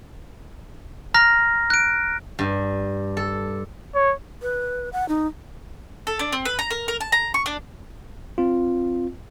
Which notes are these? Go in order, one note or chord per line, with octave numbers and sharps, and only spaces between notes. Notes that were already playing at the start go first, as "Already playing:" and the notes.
A#5 F6 A#6
F#6 D7
G2
A4
C#5
B4
F#5
D#4
A4
D4
C4
B4
A#5
A#4
A#4
A5
A#5
C#6
D4
C4 F4